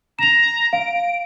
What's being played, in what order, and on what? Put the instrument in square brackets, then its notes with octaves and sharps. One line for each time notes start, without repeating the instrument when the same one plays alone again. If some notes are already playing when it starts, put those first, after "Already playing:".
[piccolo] A#5 [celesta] E7 F7
[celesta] F5 [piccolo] D7